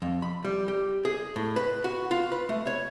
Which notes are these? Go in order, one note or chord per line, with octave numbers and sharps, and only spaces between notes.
F2
B5
G3
G4
G#4
A2
B4
F#4
F4
B4
A3
C#5